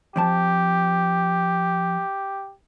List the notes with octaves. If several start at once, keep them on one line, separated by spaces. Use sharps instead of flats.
F2 F3 G4 A5